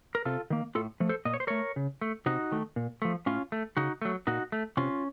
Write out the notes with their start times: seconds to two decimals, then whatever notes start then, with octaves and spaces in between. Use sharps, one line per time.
0.15 A#4
0.25 C3 F4 A4
0.50 D#3 A#3
0.75 A2 F4 A4
1.00 F3 A3
1.09 A4 C5
1.25 A#2 D#5
1.34 C#5
1.40 C5
1.47 A3 A#4 C#5
1.76 C#3
2.01 A3
2.26 C3 D#4 F#4
2.52 D#3 A3
2.76 A#2
3.02 F3 A3
3.26 A2 C#4 F4
3.52 A3
3.77 C#3 D#4 F#4
4.02 F#3 A3
4.27 A#2 D#4 F#4
4.52 A3
4.77 C3 C#4 F4